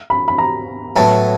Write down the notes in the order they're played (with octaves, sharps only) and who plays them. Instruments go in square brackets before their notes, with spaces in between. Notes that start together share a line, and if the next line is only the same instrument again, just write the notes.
[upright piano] B5
B5
A#5
[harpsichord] A2 F#3 B3 [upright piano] A5